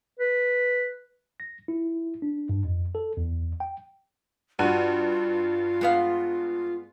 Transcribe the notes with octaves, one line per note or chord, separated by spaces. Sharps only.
B4
A#6
E4
D4
G2
F2
A4
E2
G5
G2 F4 F#4 D#7
G#3 B3 F5